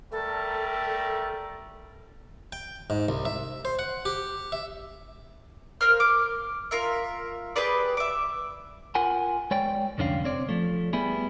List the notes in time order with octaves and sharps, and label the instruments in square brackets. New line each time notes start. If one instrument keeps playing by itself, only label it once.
[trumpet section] G3 A3 A#4 [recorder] A4
[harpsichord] G5
G#2
C2
E5
C5
F#5
G4
E5
[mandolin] A#3 A#4 C5 F6
D6
F4 A#4 E5
G4 G#4 B4 D5
E5 D6
[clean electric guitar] F4 A#4 F#5 G#5
G#3 C#5 D5 G5
C2 F2 D3 C#4 D4 F5
C4 C#5 D5
F3 A3
G3 B3 E4 G#4